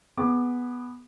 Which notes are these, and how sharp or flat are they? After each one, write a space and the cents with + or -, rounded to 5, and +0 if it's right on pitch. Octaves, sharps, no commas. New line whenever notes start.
B3 +0 G#4 +0 D6 +20